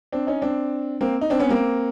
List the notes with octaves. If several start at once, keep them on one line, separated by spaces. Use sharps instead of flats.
C4 D4
C#4 D#4
C4 D4
A#3 C4
D#4
C4 D4
B3 C#4
A#3 C4